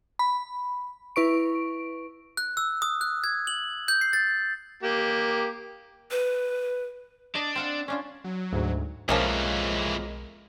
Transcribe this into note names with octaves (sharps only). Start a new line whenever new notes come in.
B5
E4 B4 C#6 D7
F#6
E6
D#6
F#6
G#6
F#7
G6
C7
A6
A#3 G4
B4
D4 D#5
C4 F5 F#5
C#4 D4 F4
F#3
D2 G#2
B1 F2 E3 F3 G#3 A#3 C#4 A#4